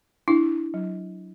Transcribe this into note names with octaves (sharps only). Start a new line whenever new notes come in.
D4 E4
F#3